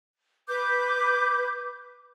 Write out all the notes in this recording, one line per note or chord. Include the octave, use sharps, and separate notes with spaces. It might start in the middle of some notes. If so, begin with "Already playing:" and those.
B4 D6 G6